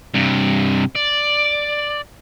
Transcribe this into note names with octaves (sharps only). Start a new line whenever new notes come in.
G2 C3
D5